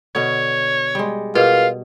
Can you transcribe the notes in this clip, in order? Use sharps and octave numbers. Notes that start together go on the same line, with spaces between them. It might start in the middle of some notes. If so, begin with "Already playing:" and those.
B2 D3 C#5
G3 G#3
B2 F4 G#4 A#4 B4 F5